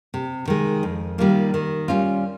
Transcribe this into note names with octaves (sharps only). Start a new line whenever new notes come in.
C3
D#3 G#3
F2
D#3 G3 A#3 F4
D#3
G3 C#4 F4